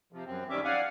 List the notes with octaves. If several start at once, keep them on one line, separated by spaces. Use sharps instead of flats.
C3 F3
F#2 C4
D#3 G3 C#4 E5 D6
D5 F5 F#5 G#5